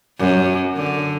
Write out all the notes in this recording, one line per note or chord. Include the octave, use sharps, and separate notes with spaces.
F#2
D3